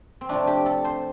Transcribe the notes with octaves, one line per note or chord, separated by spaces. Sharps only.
C4
C3 F3 A3 D4
G4
A4
C5